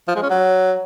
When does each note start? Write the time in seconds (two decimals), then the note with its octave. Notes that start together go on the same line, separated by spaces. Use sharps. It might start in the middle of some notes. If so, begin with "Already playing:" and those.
0.08 F3
0.16 G#3
0.23 C#4
0.30 F#3